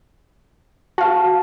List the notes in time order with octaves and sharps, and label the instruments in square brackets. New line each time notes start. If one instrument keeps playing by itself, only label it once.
[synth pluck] F#4 F5 [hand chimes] A5